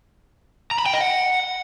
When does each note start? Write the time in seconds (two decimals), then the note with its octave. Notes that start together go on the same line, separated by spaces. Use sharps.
0.71 A#5
0.79 B5
0.86 G5
0.93 D#5
1.01 F#5